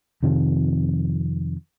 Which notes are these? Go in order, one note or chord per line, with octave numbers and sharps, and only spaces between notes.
F2 C3 D#3 F3